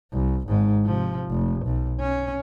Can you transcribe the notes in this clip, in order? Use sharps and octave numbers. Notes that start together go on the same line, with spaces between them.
C2
G#1 G#2
C3 F3
F1
B1
C#4